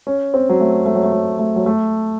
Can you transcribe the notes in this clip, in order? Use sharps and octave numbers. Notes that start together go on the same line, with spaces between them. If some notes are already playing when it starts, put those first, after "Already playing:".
C#4
C4
F#3
A3
A3
F#3
A3
F#3
A3
F#3
A3